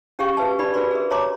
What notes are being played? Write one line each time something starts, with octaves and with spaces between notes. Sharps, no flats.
C#4 G4 G#4 F5 G5 C#6
F#4 G#4 B4 E5 A5
D4 G4 D5 B5
F#4 G#4 A#4 B4 D5 C6
G#4 A#4 E5
C#5 E5 A5 A#5 C6 D6